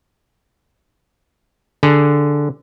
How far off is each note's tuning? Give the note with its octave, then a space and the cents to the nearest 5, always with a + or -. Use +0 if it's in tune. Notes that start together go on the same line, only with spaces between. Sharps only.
D3 +0 G#4 +0